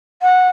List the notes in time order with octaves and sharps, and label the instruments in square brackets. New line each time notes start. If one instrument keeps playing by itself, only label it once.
[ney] F#5